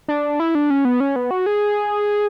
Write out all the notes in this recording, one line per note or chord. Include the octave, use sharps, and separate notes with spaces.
D4
E4
D4
C#4
B3
C#4
B3
F#4
G#4